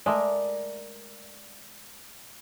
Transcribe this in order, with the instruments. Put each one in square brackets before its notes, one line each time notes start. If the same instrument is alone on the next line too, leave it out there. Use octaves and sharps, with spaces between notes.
[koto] G#3 A3 [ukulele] A#4 D5